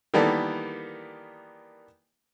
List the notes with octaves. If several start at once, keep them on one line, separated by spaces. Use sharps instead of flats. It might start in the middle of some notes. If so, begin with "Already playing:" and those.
D#3 E3 G3 A#3 B3 A4